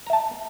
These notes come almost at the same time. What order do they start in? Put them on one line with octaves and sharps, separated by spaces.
A#5 E5 A5